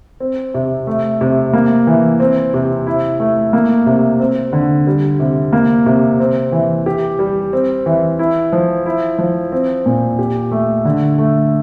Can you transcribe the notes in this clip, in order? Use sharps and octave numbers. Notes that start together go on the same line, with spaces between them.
C4
C3
A3
C3
A#3
E3
C4
C3
E4
A3
A#3
C3
C4
D3
G3
C3
A#3
C3
C4
E3
G4
G3
C4
E3
E4
F3
E4
F3
C4
A#2
G4
A3
D3
A3